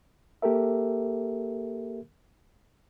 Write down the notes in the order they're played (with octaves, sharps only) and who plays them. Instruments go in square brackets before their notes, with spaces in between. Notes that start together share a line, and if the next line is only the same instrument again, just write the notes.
[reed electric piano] A#3 G4 A4 A#4 E5